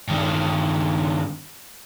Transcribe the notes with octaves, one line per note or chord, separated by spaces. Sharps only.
G2 D#3